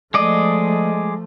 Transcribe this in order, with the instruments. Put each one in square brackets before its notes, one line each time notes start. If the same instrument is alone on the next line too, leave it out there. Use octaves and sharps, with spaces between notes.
[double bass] F3 A3 [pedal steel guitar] G#3 D5 D#5